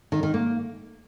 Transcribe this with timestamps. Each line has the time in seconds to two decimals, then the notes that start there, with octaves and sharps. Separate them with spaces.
0.12 D#3
0.23 D#3
0.34 A#3